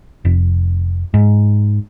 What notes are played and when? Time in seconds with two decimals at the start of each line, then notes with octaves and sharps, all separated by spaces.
0.25 F1
1.14 G#2